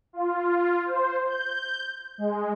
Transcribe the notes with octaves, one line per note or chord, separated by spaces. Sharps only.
F4
C5
G6
G#3